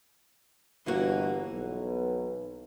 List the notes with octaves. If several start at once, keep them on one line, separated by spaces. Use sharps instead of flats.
G1 E3 A#3 F#4
B1